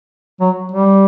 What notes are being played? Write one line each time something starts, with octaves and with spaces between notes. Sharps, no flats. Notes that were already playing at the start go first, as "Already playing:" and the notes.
F#3
G3